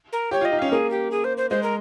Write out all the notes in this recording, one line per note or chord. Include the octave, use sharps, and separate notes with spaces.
A#4
G4 C#5
F4
D#5
D#4
C#4 F5
A#3 G#4
G4
G#4
C5
C5
G#3 C5
A#4